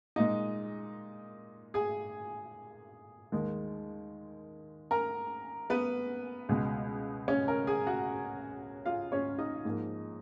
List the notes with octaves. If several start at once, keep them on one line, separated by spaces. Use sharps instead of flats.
A#2 G#3 D#4 D#5
G#4 G#5
D#2 D#3 G#3
A#4 A#5
B3 B4
C#2 B2 G#3
C#4 C#5
A#4
G#4 G#5
F#4 F#5
F4 F5
C#4 C#5
D#4 D#5
G#2 F3 A#3